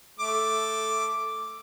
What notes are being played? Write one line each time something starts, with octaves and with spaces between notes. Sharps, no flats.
A3 D6